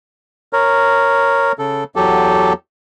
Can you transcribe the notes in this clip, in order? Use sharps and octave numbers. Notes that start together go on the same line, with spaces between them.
A#4 C#5
C#3 A4
E2 F#3 G4 A4